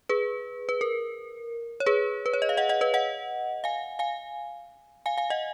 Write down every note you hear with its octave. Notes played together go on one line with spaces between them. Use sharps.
G#4 B4
B4
A#4
C#5
G#4 B4
B4
C#5
D#5
F5
D#5 F#5
D#5 F#5
B4 D#5
D#5 F#5
F5 G#5
F5 G#5
F5 G#5
F5 G#5
D#5 F#5